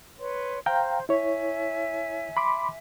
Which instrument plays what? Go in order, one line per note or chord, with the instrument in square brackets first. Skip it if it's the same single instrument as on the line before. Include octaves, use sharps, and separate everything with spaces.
[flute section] B4 C#5 C6
[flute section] C5 [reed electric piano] F5 G5 A#5
[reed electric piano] E4 C#5 [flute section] E5 G#5
[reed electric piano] B5 C6 D6